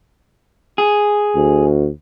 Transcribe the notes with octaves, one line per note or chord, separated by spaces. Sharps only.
G#4
D2